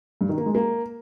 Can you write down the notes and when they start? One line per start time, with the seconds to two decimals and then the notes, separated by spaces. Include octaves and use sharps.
0.21 G2
0.29 D#3
0.38 A#3
0.46 G#3
0.55 A#3